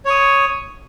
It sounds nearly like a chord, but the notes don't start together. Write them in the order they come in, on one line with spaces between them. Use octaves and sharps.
C#5 C#6 D#6